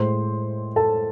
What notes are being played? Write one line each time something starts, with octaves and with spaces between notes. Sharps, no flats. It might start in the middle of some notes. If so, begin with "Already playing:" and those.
Already playing: A2 G#3 C5 C6
A4 A5